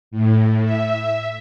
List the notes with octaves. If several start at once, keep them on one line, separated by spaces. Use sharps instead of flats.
A2
E5